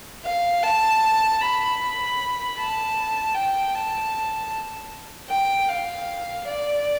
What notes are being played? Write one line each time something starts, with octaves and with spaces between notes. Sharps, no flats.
F5
A5
B5
A5
G5
A5
G5
F5
D5